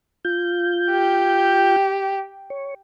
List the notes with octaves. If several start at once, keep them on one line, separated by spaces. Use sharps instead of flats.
F4 G6
G4
C#5